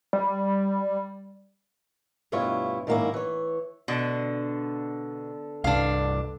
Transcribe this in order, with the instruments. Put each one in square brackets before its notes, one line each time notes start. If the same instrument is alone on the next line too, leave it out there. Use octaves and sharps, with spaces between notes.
[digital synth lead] G3
[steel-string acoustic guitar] D2 G2 B2 E4 F4 C#5
G#2 D#3 F#3 A#3 C#4 E4
E3 C#5
[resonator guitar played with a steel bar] B2 [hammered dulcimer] D3
[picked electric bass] C2 G2 [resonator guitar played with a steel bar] D4 F5